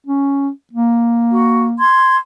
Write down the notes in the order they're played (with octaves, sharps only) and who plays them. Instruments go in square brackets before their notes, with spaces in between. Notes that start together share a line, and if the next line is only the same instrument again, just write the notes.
[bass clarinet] C#4
A#3
[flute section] F#4
C6 G#6